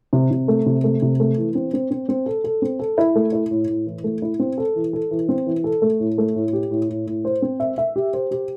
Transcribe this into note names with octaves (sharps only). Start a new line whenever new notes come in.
C3
C3
A3
C3
A3
C3
A3
E3
C4
C4
C4
C4
A4
A4
C4
A4
E4
A3
E4
A2
A2
E3
A3
E4
C4
A4
E3
A4
E3
C4
E3
A4
A3
A2
A3
A2
G4
A2
A2
A2
C5
C4
E5
E5
G4
C5
G4